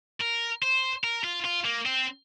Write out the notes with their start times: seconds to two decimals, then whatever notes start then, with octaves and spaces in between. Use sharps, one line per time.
0.20 A#4
0.63 C5
1.04 A#4
1.24 F4
1.45 F4
1.65 A#3
1.86 C4